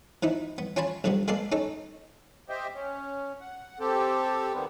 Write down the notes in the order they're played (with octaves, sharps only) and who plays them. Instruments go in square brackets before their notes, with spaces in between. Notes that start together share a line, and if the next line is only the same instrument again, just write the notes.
[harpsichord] E3 F3 D#4 E4
B3
C#4 F4 G#5 A5 B5
B1 D3 F3 G3 B3
G#3 A#3 B3 A4 D5 F5
C#4 D#4 A4
[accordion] G4 C5 D#5 E5 G5
C#4
F#5
C4 G4 A4
D#3 G3 B3 C4